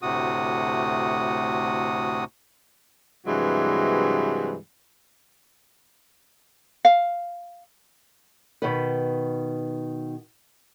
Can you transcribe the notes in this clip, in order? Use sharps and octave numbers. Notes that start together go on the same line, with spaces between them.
D2 A2 C3 F#4 D#6
G2 C3 E3 F#3 G#3
F5
B2 D#3 B4